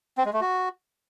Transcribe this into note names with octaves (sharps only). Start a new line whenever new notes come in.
C4
G#3
A3
F#4